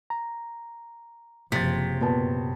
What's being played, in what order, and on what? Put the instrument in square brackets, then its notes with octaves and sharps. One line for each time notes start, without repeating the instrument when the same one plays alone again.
[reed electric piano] A#5
[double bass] F#1 F3 [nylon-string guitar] C3 [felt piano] A6 B6
[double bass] F#2 [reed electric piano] A#2 [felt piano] B3 A5